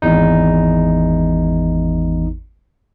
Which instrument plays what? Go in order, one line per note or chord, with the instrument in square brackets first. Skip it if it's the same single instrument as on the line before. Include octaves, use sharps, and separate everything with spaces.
[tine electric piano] G#1 E2 D#4